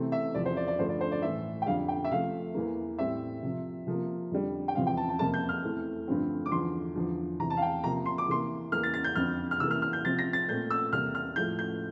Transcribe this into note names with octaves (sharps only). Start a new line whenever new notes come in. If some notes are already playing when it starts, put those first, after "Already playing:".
Already playing: C3 E3 A3 C4
E5
E2 C3 F3 D5
C5
D5
D5
G2 D3 F3 A3 C5
D5
C5
D5
A2 E3 A3 E5
G5
F2 D3 G3 F5
G5
E5
C3 F3 A3 F5
E2 E3 A#3
A2 G3 C4 E5
C3 F3 C4
C3 F3 A#3
F2 D3 G3
G5
E2 C3 F3 C4 F5
G5
A5
A5
F2 C3 F3 A#3 A5
G6
F6
E2 E3 A3 C4
G2 D3 F3 A3 C4
D6
E2 D3 F3 C6
E2 D3 F3
E2 C3 E3 A#5
A5
F5
G5
C3 F3 A#3 A#5
C6
D6
C3 E3 A#3 C6
E2 E3 A#3 F6
A6
A6
G6
F2 D3 F3 C4 F6
F6
C3 E3 A#3 E6
F6
F6
G6
C3 F3 C4 A6
A#6
A6
A#2 A3 C4 G6
E6
E2 C3 G3 A#3 F6
F6
A2 F3 A3 G6
G6